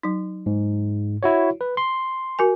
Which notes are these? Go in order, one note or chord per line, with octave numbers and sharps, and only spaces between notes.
F#3 D#4
G#2
E4 F#4 C#5
B4
C6
F#4 A#4 G#5